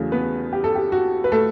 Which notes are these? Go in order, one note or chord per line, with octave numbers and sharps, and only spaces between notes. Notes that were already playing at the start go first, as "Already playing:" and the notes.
Already playing: E2 C#3 F#3 A3
B3 B4
G4
A4
G4
F#4
B4
A3 A4